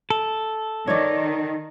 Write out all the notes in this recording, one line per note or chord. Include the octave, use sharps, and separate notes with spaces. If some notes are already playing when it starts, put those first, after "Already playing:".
A4
D#3 C#5 D5